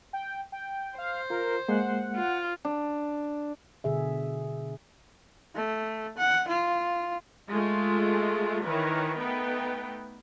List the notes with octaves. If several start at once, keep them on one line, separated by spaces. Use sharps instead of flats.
G5
G5
C5 F5
F4 A#4
G#3 A#3 F#5
F4
D4
B2 D3 G#4 E5
A3
F#5
F4
G#3 A3 F4
D#3 E3 E4 A#4 B4 C#5
A3 B3 D#4 B4 G5